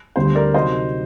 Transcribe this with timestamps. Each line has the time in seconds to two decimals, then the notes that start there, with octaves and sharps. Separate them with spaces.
0.16 D2 D3 G3 C4 C5
0.35 A#4 D5
0.54 C3 F#3 C4 D#4 C5 D#5